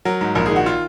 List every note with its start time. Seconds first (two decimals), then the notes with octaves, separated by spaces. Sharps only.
0.05 F#3 A#4
0.21 G#2
0.35 A#1 A#4
0.46 D#3 G#4
0.56 F#4
0.66 F4